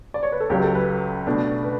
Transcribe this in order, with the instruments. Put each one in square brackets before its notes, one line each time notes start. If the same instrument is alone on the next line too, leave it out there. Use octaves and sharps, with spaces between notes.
[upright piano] D5
C#5
B4
A4
C#2 C#3 F#3 G4
A4
B4
B2 A3 D4
B4